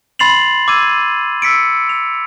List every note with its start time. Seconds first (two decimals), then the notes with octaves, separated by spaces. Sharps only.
0.19 B5 C6 A6 C7 F7 F#7
0.68 D6 E6 G#6 D#7
1.42 E6 B6 C#7 D7
1.89 F7